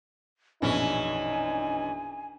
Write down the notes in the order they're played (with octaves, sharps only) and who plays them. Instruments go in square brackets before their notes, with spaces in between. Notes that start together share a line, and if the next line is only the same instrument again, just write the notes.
[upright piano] A#1 F#2 B2 [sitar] E3 C#4 [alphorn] D#4 [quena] G#5